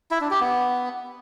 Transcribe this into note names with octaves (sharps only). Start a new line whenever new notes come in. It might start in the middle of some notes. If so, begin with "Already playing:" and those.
E4
D4
G4
B3